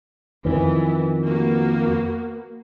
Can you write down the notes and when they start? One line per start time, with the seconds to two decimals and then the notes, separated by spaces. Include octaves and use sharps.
0.45 F2 D#3 E3 B3
1.26 A#3 B3 F#4